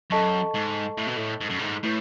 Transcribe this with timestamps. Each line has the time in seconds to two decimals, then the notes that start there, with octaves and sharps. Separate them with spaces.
0.11 F#2 A4 D#5 A5 C#6
0.55 G#2
0.98 A2
1.07 B2
1.17 A2
1.41 G#2
1.50 F#2
1.59 G#2
1.84 A2 E4 B4